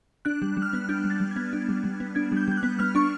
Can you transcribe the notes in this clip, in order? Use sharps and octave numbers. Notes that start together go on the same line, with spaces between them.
D4 F#6
G3
G3
F6
B3 F#6
D4 G6
G3
A6
G3
G#6
B3
D4
G3
G3
B3
D4 G#6
G3 G6
G3 G6
F#6
B3
B3 F6
D4 C#6